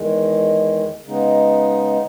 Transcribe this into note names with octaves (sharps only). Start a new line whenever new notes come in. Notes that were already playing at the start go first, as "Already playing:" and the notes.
Already playing: E2 D#3 G#3
C#3 G#3 B3 D#4